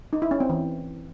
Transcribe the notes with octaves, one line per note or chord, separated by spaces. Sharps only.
D#4
E4
C#4
C4
E3